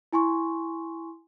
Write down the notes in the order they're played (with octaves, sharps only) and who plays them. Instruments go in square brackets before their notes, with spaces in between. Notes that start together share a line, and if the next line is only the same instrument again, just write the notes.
[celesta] E4 G#5 C6 C#6